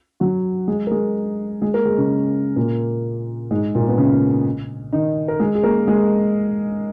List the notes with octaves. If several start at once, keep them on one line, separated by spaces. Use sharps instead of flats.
F#3 F#4
G#3 G#4
A#4
G#3 G#4
G#3 G#4
A#3 A#4
G#3 G#4
C#3 C#4
A#2 A#3
G#2 G#3
A#2 A#3
B3
C#3 C#4
D#3 D#4
A#4
G#3 G#4
G#4
A#3 A#4
G#3 G#4